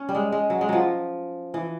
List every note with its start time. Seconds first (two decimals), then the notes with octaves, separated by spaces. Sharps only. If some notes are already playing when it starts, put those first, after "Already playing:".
Already playing: C#4
0.09 G3
0.15 G#3
0.32 G#3
0.50 F#3
0.61 G#3
0.69 F3 F#3
1.54 E3